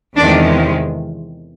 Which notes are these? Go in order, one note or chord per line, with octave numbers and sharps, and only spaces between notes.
E2 C3 D#3 G#3 D4